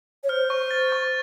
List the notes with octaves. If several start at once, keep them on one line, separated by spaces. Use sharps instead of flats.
C#5
C5 F6
C#6
A6
C#6